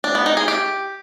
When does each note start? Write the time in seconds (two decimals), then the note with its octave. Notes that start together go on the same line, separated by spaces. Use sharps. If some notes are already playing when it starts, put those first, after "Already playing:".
0.04 D4
0.15 B3
0.26 D#4
0.37 G#4
0.48 G4